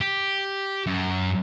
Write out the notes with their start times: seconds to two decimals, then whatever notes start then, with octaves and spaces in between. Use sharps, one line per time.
0.01 G4
0.87 F#2